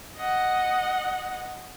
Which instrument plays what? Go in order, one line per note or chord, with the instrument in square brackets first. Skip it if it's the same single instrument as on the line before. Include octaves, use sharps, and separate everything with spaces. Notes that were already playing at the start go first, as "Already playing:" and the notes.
[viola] D#5 F#5